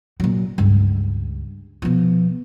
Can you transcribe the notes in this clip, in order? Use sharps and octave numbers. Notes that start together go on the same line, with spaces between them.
A#2 F#3
C#2 G2
B2 F3